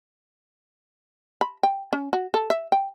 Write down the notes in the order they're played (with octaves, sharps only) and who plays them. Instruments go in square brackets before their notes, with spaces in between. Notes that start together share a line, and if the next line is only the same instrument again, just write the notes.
[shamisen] B5
G5
C#4
F#4
A4
E5
G5